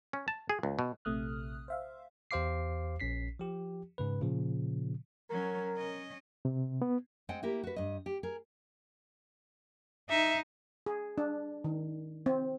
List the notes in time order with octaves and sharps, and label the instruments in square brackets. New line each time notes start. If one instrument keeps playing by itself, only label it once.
[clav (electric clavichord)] C#4
A5
G#4
C#2
B2
[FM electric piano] A#1 C3 A3 D#6 F6 F#6
C5 E5 F5
[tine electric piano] E2 G4 C5 F5 D6 C7
A#1 C#4 B6 C7
F3 G4
G#2 C#3 B4
A#2 C#3 F3
[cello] F#3 C#4 [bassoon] A#4
[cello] C#4 D#5
[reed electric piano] C3
B3
[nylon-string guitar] G#3 C4 C5 F#5 G5
A#3 E4 G4 A#4
F#4 B4
G2 D#5
G4
G#4 A#4
[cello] D#4 [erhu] E5
[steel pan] G#4
D4
D#3
C4